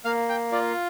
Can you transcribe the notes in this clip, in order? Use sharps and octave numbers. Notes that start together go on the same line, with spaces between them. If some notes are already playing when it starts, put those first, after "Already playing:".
A#3 F5
G5
F4 D5